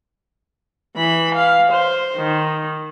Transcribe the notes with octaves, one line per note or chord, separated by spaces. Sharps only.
E3 B5
F5
C5
D#3